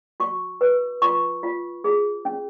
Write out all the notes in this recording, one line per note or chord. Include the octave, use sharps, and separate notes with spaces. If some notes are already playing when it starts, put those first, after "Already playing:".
F#4 C#6
B4
F4 C#6
F4
G#4
C#4